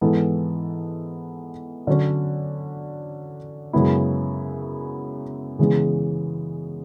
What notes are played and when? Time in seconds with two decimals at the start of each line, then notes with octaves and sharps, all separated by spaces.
0.01 G#2 E3 B3 E4 A4
1.87 D3 F#3 C#4
3.73 F#2 C#3 G#3 B3 E4
5.59 C#3 E3 G#3 B3